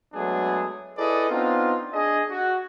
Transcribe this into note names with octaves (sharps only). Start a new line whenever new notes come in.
F#3 G#3 A3 B3 D4 G#4
E4 G#4 A4 B4 D5 D#5
B3 C4 D4 D#4 F4
D4 G#4 D#5
F#4